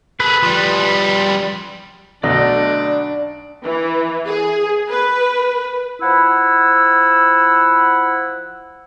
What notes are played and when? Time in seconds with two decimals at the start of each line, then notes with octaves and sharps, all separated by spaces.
0.20 G#4 A4 B4
0.43 F3 G3
2.23 B1 B2 D3 A3 D4 D5 D#5
3.64 E3
4.26 G#4
4.90 B4
6.00 F3 E4 F#5 E6